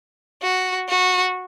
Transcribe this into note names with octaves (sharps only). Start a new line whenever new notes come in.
F#4
F#4